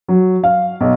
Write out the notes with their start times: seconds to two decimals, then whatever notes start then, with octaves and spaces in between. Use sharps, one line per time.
0.08 F#3
0.44 F5
0.81 B1